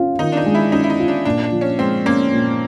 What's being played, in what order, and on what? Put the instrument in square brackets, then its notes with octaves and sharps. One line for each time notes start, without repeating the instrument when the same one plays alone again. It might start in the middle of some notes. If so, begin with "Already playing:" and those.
Already playing: [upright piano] C#4 F4
[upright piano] D#3 [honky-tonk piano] D#4
[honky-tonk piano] D4
D#4
[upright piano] G#3
[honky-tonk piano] E4
[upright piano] C#4 [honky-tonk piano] D#4
[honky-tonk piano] E4
D#4
[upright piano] F4
[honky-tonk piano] D4
[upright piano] A#2 [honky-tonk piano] D4
[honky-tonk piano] D4
[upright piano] F3
[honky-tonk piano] C#4
[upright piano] G#3 [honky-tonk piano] C4
[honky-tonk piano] A#3 [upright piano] C#4
[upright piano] A#2